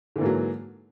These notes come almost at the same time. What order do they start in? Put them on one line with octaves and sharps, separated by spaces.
D3 E3 G#2 A#3 F#3